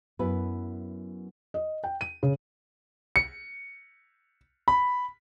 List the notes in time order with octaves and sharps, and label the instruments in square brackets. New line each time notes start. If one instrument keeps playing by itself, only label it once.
[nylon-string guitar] F#2 B3 E4 B4
[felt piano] D#5
G5
D#7
C#3
[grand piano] C#7
B5